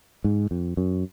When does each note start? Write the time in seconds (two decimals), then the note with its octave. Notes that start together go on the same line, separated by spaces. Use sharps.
0.24 G#2
0.51 F2
0.77 F#2